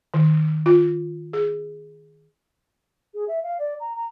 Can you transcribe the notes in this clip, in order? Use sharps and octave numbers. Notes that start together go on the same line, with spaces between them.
D#3
F4
G#4
G#4
E5
F5
D5
A#5
A#5